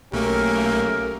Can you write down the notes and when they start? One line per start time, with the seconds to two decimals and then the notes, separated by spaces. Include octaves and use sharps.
0.12 B1 A3 A#3 C#4 G4 A#4